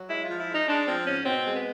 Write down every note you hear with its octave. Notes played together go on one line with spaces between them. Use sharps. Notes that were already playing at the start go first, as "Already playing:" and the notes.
Already playing: F#3
G#3 E4
F4
F3
E4
G#3 D#4
G#3 D4
F3 C4
G#2 C#4
B2 C4
G#3
B3